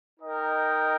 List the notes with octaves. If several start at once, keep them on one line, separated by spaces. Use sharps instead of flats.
D#4 A#4 D#5 G5